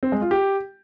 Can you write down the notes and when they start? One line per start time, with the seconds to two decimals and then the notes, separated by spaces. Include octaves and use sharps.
0.03 C4
0.12 G#3
0.22 F4
0.31 G4